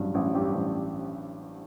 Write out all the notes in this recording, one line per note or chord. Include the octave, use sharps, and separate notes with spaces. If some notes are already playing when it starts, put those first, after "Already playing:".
Already playing: A1 G2 F#3
A1
G2 G4
A1